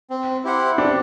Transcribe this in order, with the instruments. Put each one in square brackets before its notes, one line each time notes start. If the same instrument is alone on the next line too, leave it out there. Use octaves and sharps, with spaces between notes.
[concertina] C4
E4 G4 C5 F#5
[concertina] C4 [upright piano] D4